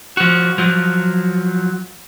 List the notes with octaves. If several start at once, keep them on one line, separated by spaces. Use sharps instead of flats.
F3 F#4
F3 F#3